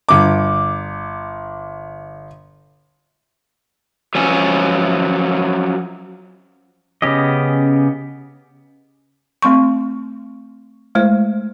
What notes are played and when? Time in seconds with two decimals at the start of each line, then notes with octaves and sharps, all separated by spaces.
0.09 G1 D6
4.15 F3 F#3 C#4 B4 G#5
7.02 C#3 B3 C#4 G4 D#5
9.42 A3 C4 C6 C#6
10.95 G#3 A3 E4 C5